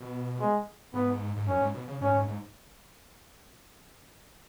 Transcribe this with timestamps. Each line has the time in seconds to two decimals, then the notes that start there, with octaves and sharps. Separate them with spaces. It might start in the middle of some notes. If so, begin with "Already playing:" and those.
Already playing: B2
0.40 G#3
0.94 G#2 B3
1.36 G#2
1.47 F#2 C#4
1.61 G#2
1.74 B2
1.88 C#3
2.01 G#2 C#4
2.14 G#2
2.28 G#2